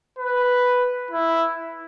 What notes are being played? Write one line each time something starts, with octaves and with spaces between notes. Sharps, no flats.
B4
E4